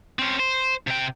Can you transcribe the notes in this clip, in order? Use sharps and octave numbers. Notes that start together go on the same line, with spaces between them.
C4 C#4
C5
C3 G5